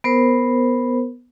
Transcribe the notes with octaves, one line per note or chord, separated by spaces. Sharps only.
B3 A#4 C5